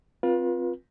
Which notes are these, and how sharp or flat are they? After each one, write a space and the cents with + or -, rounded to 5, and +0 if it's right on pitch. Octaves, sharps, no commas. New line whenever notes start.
C4 +0 F4 +15 B4 -35